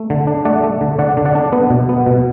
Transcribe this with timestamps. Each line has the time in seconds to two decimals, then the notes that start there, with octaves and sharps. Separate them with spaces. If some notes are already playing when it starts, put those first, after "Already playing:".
Already playing: A3
0.10 D3
0.27 D4
0.45 A3 D5 F#5
0.63 A3
0.81 D3
0.99 D3 D5 F#5
1.17 D3
1.25 D5 F#5
1.35 D4
1.52 B3
1.70 B2
1.89 B3
2.06 B2